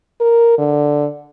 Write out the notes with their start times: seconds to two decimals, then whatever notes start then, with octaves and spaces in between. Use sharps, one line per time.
0.21 A#4
0.59 D3